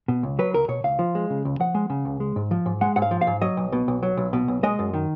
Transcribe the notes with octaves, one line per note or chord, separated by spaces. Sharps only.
B2
C#2
F#3 B4
C#2 A#4
B2 C#5
C#2 F5
F3
G#3
C#3
C#2
F3 F#5
G#3
C#3
C#2
G#3
G#2
F3
G#2
G#3 F#5
G#2 F#5
F5
F3
F5
G#2
F#3 D#5
B1
B2
B1
F#3
B1
B2
B1
G#3 D#5
F#2
D#3